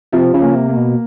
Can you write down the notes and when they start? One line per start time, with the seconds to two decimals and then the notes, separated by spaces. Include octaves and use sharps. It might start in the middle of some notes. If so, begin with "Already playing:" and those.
0.12 C3 F3
0.34 C#3
0.41 A#3
0.55 C3
0.69 A#3
0.76 B2